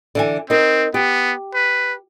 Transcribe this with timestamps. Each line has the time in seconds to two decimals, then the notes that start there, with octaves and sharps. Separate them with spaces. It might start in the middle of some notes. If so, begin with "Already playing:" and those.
0.15 D3 E3 G#5
0.50 C4 D#4 A#4
0.94 B3 G4
1.54 B4